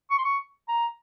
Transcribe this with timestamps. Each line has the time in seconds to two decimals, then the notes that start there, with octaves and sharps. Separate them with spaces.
0.11 C#6
0.18 C6
0.24 C#6
0.69 A#5